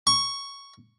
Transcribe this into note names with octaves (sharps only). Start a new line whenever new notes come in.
C#6